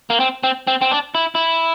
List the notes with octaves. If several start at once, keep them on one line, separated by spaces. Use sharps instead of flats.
A#3
C4
C4
C4
C4
D4
E4
E4